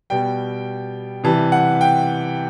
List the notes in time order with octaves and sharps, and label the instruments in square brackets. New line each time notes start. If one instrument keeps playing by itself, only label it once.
[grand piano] B2 G3 G5
C3 E3 G3 A5
F#5
G5